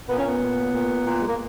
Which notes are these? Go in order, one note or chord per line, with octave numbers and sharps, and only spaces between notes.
A#2 B3
C#4
B3
A#2
A#2
A#2
G#3
A#3